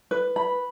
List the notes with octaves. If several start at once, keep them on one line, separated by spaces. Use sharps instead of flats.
B4
B5